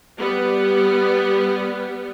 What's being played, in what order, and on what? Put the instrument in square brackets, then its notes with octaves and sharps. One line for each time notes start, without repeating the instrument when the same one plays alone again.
[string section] G3 B3